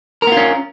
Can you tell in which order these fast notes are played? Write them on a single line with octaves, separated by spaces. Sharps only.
A#4 B3 F4 C#4